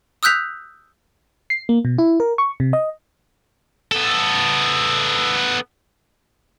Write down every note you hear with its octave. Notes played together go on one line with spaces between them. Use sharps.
D#6 E6 F#6 G6 B6 F7
C7
A#3
B2
E4
A#4
C#6
C3
D#5
B3 A4